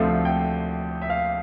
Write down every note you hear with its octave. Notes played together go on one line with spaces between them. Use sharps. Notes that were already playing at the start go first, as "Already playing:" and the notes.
Already playing: D2 C3 F3 A3 F5
G5
E5
F5